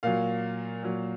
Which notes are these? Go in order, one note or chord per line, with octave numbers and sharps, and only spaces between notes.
A#2 F#3 F5
A#2 F#3